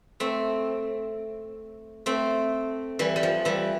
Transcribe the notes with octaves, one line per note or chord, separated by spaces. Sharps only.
A3 C4
A3 C4
E3 G3
G3
F3
E3 G3